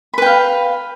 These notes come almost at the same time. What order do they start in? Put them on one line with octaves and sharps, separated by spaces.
B5 B4 G5 F5